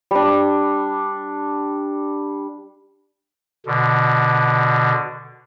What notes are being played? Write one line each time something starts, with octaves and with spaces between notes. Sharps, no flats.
G3 D4
B2 D3